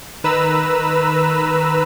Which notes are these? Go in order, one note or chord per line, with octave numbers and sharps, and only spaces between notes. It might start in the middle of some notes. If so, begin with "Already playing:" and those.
D#3 B4 A#5 E6